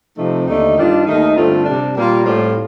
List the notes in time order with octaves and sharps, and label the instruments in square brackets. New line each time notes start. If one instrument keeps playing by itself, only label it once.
[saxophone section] C3 F3 A3 C4 D#4
D#2 D3 A3 D#4
G2 D#3 G3 D4 F4
D#2 D#3 A3 D#4
G2 D3 A3 C4 F4
C3 G3 D4
A#2 G3 A#3 F4
A2 G3 C4 F4